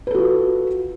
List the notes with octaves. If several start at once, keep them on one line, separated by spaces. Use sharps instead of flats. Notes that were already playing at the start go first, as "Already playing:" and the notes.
F4 F#4 A4 B4